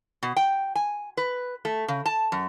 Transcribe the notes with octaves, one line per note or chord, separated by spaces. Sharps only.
B2
G5
G#5
B4
A3
C#3
A5
F#2